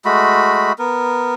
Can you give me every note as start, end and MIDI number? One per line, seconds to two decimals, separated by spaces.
0.05 0.72 56
0.05 0.72 57
0.05 0.72 66
0.05 0.72 83
0.79 1.35 59
0.79 1.35 70